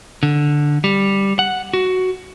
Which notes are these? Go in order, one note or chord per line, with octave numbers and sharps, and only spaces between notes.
D3
G3
F#5
F#4